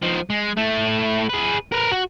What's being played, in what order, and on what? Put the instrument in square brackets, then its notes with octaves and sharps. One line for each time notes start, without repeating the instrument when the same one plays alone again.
[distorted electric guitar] F3 D#4
G#3
A3 E4
G#4 B4
A#4 B4
F#4